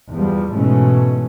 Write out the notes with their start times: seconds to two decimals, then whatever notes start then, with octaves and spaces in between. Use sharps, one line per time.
0.12 E2 F3 G3
0.54 G#2 B2 E3 A3 C#4